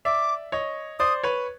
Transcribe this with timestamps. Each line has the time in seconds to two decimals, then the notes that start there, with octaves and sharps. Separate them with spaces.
0.05 D5 E5 D6
0.52 C#5 D#5
0.99 C5 D5 D#6
1.23 B4 C#5